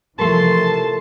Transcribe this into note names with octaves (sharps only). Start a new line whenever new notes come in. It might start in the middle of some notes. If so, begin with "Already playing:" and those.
C3 E3 F3 A3 A#4 A5 C6